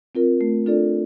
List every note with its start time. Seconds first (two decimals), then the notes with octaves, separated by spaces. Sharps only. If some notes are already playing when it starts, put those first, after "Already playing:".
0.15 C4 F4 A#4
0.41 A3
0.66 D4 F4 A4 D5